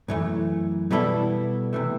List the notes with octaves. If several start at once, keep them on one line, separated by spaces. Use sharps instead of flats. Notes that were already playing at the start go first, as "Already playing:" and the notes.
F#2 E3 A3
B2 G3 B3 E4 A4
C3 E3 A3